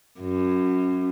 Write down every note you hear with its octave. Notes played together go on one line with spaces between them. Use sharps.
F#2